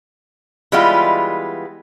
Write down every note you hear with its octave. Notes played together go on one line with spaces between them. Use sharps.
E3 G3 G#3 B3 F4